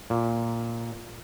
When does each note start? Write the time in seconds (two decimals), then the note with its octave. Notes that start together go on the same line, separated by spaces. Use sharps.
0.10 A#2